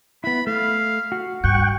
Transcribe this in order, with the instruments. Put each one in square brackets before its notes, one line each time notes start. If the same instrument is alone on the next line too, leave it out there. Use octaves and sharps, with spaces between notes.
[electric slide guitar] B3 E4 [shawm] B5
[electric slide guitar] A3 [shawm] F5
[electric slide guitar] F#4
[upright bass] G2 [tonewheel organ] F#5 G5 [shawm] C#6